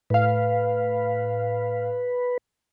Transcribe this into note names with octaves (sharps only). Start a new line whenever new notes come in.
A2 B4 F5